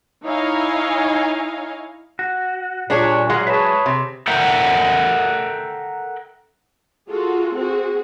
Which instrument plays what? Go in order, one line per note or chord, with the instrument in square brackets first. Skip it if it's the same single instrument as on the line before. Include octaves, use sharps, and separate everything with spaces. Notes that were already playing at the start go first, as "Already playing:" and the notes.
[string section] D#4 E4 C#5 D#5 F5 G#5
[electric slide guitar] F#4
[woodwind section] A#2 [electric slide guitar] G3 [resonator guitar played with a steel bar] D4 G#4 C#5
[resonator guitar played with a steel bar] F#3 G#3 [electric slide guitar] F4 F#4
[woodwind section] G#4 B4 C#5 [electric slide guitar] E5 A5
[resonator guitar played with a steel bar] C3
[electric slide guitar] A4 A#4 E5 F#5 G5
[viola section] F4 F#4 G#4 A4
C4 F#4 G#4